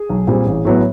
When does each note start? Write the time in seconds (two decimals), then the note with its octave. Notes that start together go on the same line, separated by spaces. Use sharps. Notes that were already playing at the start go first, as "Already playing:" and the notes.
Already playing: G#4
0.09 B1
0.27 A#2 G3 C4
0.46 A1
0.65 A2 F#3 B3